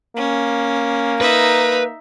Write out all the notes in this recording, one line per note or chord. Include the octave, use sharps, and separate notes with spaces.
A#3 C#4
D#4 B4 E5